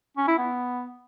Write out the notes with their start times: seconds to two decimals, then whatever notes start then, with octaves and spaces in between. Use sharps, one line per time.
0.17 C#4
0.28 E4
0.38 B3